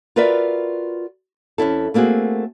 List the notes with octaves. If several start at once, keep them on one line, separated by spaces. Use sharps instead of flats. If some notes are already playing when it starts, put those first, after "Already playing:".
F4 F#4 A#4 B4 D5 E5
F2 C#4 E4 A4
A3 A#3 C4 F#4 G#4